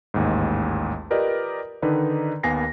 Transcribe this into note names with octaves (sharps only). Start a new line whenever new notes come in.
A1 D#2 G#2
F4 G4 A#4 B4 D5 D#5
D3 D#3 D#4 B4 D5
D#2 A#3 B3 G#5 A#6 C7